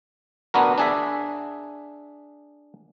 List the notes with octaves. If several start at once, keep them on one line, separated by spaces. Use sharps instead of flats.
B3 D4 F#4 A#4
D4 G#4 E5